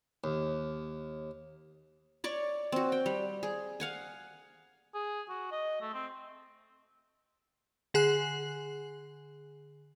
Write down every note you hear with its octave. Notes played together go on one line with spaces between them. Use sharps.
D#2
C#5 D5 C#6
C4 F#4
G5
G3
G#4
F5 F#5 G#5
G#4
F#4
D#5
A3
C4
D3 G#4 G#5 F#6